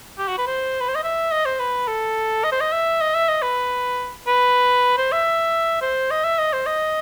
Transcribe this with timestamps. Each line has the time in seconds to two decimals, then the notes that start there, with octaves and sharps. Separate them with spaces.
0.18 G4
0.28 F#4
0.38 B4
0.47 C5
0.81 B4
0.89 C5
0.95 D#5
1.03 E5
1.31 D#5
1.46 C5
1.60 B4
1.88 A4
2.44 D#5
2.52 C5
2.61 D#5
2.72 E5
3.01 D#5
3.14 E5
3.29 D#5
3.42 B4
4.27 B4
4.98 C5
5.12 E5
5.82 C5
6.11 D#5
6.24 E5
6.39 D#5
6.53 C5
6.67 D#5